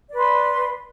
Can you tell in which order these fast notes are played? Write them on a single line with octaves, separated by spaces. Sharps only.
D5 B4 C6